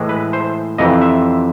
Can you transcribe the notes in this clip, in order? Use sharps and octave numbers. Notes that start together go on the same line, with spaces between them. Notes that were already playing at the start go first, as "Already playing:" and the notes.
Already playing: A2 E3 G#3
B4
C5
F2 C3 E3 D#5
E5